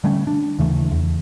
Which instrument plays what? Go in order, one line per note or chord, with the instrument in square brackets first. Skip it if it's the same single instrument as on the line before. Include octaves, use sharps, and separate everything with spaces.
[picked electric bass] D3 G3 A3 C#4
D4
D#2 C#3 E3 A3
E2